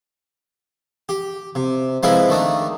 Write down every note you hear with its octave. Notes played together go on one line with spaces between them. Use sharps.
G4
C3
F3 G#3 C4 E4 A#4 B4
D#3 A3 D4 D#4